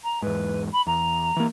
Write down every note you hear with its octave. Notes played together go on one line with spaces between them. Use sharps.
A#5
E2 G#2 B4
B5
E2 A#5
E3 A#3